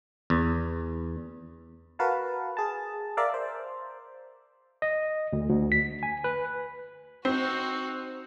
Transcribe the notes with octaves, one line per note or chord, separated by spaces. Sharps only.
E2
F#4 A#4 B4 F5 F#5 A5
G#4 A5
A#4 D5 E5 F5
C5
D#5
D2
D2
B6
G#5
B4
C4 D#4 F#4